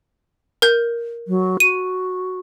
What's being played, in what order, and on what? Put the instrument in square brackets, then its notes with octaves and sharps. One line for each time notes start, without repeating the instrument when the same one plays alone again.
[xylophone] A#4 G6
[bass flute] F#3
[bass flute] F#4 [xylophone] D#7